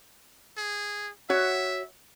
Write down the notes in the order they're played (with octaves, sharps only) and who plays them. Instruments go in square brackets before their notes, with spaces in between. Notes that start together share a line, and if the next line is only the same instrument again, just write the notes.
[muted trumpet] G#4
[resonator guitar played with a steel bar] F#4 C#5 [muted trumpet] E5